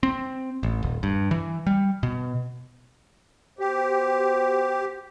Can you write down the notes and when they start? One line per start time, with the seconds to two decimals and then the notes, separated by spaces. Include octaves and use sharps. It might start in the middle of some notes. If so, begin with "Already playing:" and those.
0.03 C4
0.63 A1
0.83 D#1
1.03 G2
1.31 E3
1.67 G3
2.03 B2
3.59 B3 F#4 G4 C5